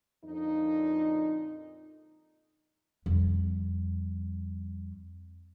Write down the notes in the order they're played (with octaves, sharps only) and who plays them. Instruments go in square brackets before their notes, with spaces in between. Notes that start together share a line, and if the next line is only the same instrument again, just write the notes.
[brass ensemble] F2 A#2 D3 D#4
[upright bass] F2 G3